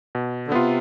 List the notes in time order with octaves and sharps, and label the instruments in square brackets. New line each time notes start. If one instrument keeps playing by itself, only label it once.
[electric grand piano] B2
[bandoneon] D3
[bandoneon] C3 [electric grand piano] B3 F4